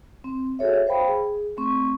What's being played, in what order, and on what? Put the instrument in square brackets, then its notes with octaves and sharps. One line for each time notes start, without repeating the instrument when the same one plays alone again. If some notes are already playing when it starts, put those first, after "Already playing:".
[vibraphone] C4
F#4 G#4 A4 C#5 E5
C5 F5 G5 B5
G#4
A3 C4 C#6